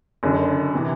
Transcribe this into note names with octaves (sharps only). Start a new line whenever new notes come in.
F#1 F#2 D3
C3 E3